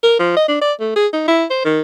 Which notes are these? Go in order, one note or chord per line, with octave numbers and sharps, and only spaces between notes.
A#4
F3
D#5
D4
D5
A3
G#4
D#4
E4
C5
D#3